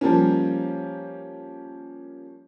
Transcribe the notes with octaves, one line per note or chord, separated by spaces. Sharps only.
F3 G3 A#3 C#4